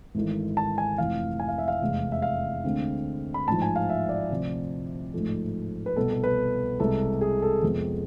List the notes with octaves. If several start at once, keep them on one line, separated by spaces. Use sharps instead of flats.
G#1 G#2 E3 A3
A5
G#5
F1 F2 E3 F5
G#5
F5
E5
F5
F1 E2 C3 G#3
E5
F5
D2 D3 G#3 C4
B5
A1 G#2 F3 A5
G#5
F5
E5
D5
D2 C3 F3
A1 G#2 F3 A3
B4
C2 B2 B3 A4
A4
B4
C2 C3 G#3 A4
G#4
A4
F2 C3 G#3 B3